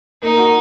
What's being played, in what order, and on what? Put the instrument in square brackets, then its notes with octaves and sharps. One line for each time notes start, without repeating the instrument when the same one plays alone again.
[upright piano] A#3 [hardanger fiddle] D#4
[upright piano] F#4